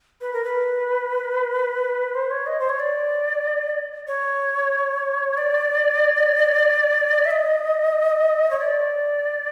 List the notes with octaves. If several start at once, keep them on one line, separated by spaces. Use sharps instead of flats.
B4
A#4
B4
C5
C#5
D#5
C5
C#5
D5
C#5
D5
E5
D#5
C#5
D5